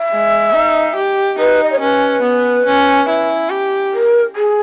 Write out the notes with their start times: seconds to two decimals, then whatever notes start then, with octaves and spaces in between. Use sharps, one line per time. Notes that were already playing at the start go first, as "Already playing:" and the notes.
Already playing: E5
0.11 G#3
0.53 D#4
0.95 G4
1.38 D#4 B4
1.63 D#5
1.72 C#5
1.81 C#4 B4
2.22 B3
2.66 C#4
3.08 E4
3.50 G4
3.93 A#4
4.35 G#4